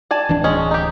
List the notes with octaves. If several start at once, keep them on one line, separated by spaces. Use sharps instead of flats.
D5 G#5 A5
D1 E3 D4
G#3 C#4
D#4 G4